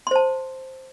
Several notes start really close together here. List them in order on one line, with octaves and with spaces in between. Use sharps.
C6 C5 A5